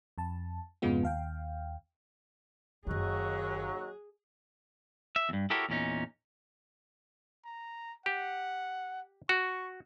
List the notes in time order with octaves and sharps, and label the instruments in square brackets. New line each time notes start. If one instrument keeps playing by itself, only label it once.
[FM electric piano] F2 A5
F2 G#2 C#3 G#3 B3 F4
D#2 F5 G5
[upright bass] F#1 D#3 [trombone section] D#2 F#3 [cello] G#4 [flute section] D#5 C#6 F#6
[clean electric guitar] E5
E2 G2
E4 F#4 G4 A4 A#4 C#5
E2 A#2 C#4 D#4
[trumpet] A#5
[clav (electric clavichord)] G4 [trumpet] F#5
[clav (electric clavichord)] F#4 [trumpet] C#6